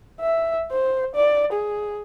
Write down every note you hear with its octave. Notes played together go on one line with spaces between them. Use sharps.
E5
C5
D5
G#4